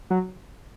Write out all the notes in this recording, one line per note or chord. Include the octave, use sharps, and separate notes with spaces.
F#3